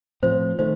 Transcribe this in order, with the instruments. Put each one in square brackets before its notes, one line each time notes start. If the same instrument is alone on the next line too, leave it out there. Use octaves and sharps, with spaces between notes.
[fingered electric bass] A2 F3 C4 [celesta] C5
[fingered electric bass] D#3 A3 [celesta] C5